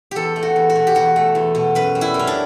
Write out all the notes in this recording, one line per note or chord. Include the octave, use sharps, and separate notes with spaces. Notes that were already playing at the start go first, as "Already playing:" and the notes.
E2 G4 A4
A3
F#4
E2
F#4
B2
G4
E2 F#4
A3
E2
B2
F#2 B4
G3
E4
F#2
C#4
D4